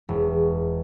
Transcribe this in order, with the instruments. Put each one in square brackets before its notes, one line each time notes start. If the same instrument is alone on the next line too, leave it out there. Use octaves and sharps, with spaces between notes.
[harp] E1